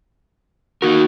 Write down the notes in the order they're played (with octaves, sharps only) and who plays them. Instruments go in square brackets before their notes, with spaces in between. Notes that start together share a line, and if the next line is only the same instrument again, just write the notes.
[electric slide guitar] A#3 D#4 A#4 [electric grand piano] F#4